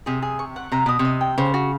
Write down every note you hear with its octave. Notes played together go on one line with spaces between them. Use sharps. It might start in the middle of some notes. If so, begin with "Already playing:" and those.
C3 G#4
G#4
C#6
F#5
C3 A#5
B2 D#6
C3
D#5
G5
C#3 C5
F#4